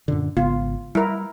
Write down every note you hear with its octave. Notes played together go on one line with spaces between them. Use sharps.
F#2 A#2 D3
G#1 C#3 B3 F4
G3 E4 A#4